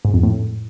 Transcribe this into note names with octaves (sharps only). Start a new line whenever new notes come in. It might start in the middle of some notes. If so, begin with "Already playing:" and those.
G#2
F2
A2